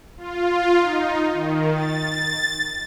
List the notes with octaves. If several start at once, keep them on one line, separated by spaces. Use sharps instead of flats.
F4
D#4
D#3
A6